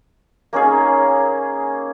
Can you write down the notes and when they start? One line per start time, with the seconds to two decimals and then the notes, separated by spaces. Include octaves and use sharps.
0.53 A#3 C#4 D#4 G#4